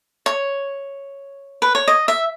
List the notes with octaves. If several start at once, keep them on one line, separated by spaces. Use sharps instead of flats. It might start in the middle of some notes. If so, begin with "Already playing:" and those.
C#5
B4
C#5
D#5
E5